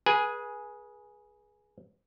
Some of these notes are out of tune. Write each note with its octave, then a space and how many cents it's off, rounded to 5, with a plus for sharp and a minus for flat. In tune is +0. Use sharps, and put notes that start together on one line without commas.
G#4 +5 B4 -30 G#5 +0